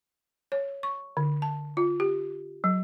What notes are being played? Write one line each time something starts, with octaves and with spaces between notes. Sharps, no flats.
C#5
C#6
D3
A5
F4
G4
F#3